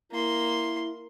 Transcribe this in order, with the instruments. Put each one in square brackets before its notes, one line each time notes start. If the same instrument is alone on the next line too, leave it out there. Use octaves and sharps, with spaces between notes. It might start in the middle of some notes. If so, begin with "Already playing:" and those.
[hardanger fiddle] A#3 C6 [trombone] E4